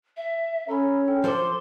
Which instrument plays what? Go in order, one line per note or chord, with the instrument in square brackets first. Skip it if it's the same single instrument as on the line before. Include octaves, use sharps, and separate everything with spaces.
[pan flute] E5
[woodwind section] C#4 [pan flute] A4 [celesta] A#5 B5
[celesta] D4 G5
[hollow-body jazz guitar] F3 A4 C5 [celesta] A#4 D6 [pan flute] C6